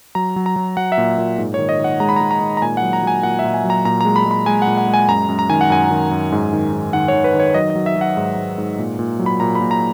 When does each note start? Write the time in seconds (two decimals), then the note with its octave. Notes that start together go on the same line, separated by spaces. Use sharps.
0.15 F#3 A#5
0.36 F#3
0.46 A#5
0.56 F#3
0.77 F#3 F#5
0.92 E5
0.98 A#2
1.18 A#2
1.38 G#2
1.54 D#3 C#5
1.69 D#5
1.79 D#3
1.84 F#5
2.00 G#3 A#5
2.09 B5
2.16 G#3 A#5
2.31 A#5
2.41 D#3
2.57 A#5
2.62 A#2 G#5
2.77 F#3 F#5
2.93 A#5
3.03 F#3 G#5
3.23 A#2 F#5
3.39 E5
3.44 A#2
3.54 G#5
3.64 F#3
3.70 A#5
3.85 A#2 A#5
4.01 G#3 A#5
4.16 B5
4.26 G#3
4.31 B5
4.46 G#3 G#5
4.62 F#5
4.67 A#2
4.78 F#5
4.88 G#3
4.94 G#5
5.08 F#2 A#5
5.29 F#2
5.39 A#5
5.50 D#3 G#5
5.61 F#5
5.70 F#2 G#5
5.91 D#3
6.11 F#2
6.32 G#2
6.53 D#3
6.73 G#2
6.93 D#3 F#5
7.08 C#5
7.14 D#3
7.24 B4
7.34 D#3
7.40 C#5
7.54 F#3 D#5
7.70 D#5
7.75 F#3
7.86 E5
7.96 F#3 F#5
8.17 G#2
8.38 G#2
8.58 G#2
8.78 A#2
8.99 A#2
9.19 F#3
9.26 B5
9.40 A#2 A#5
9.55 B5
9.61 A#2
9.71 A#5